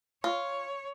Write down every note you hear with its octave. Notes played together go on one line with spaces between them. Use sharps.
F4 C#5